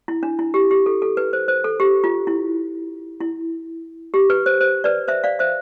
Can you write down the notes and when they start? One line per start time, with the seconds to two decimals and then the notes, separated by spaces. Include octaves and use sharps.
0.08 E4
0.23 D4
0.39 E4
0.54 G4
0.71 G4
0.86 A4
1.02 A4
1.17 B4
1.33 C5
1.48 C5
1.64 A4
1.80 G4
2.04 F4
2.27 E4
3.21 E4
4.14 G4
4.30 B4
4.46 C5
4.61 C5
4.84 B4 D5
5.08 C5 E5
5.24 D5 F5
5.39 C5 E5